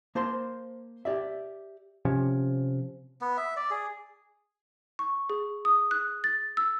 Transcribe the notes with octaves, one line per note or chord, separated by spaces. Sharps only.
A#3 C5 A5 C6
G4 D5 E5
C3 F3 C#4
B3
E5
D5
G#4
C#6
G#4
D#6
F#6
A6
E6